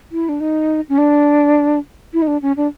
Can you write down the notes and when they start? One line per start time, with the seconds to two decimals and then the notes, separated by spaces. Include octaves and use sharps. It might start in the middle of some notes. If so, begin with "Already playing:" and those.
0.12 E4
0.29 D4
0.40 D#4
0.89 C#4
0.98 D4
2.13 E4
2.22 D#4
2.27 D4
2.42 C#4
2.57 D4